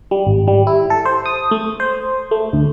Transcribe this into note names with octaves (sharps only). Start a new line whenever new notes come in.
G3
G#1
G3
E4
A4
C5
D#6
A3
C5
A3
D2